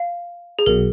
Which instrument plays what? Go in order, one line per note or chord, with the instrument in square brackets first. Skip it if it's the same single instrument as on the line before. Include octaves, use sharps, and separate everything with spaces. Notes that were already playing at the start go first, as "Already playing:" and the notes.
Already playing: [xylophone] F5
G#4
[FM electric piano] B1 B2 F#3 [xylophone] A#4